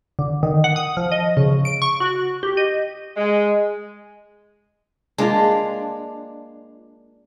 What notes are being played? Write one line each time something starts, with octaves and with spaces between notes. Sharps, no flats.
D3
D#3
F#5
D#6
F3
D#5
C#3
D7
C#6
F#4
G4
D#5
G#3
G#3 A#3 D4 F4